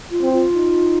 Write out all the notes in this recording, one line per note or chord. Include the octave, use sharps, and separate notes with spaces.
F4
C4
F4
D#4